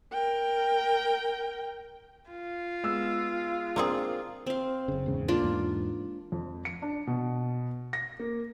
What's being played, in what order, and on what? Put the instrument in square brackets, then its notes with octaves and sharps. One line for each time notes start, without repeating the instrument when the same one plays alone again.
[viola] A#4 G5
[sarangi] F4
[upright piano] G#3 B3 E6
[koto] A#3 C4 G#4 [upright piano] D4
[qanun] C4 F5
[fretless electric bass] F#1 C#3
E2 G#2 C#3
[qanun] A#3 D4 F4
[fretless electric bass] E2 G#2
[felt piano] F2
C#7
D4
B2
A#6
A#3